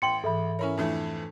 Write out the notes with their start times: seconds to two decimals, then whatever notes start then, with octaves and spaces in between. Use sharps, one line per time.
0.02 A1 G5 C6 C#7 F#7
0.24 G#2 E3 A4 E5 B5
0.59 C#4 E4 A#4 C#5 C#6
0.77 F2 E3 A3 D4